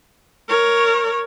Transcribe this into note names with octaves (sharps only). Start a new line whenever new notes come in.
A#4 C#5